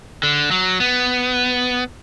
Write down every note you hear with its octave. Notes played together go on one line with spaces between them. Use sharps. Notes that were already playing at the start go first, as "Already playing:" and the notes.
D3
F#3
B3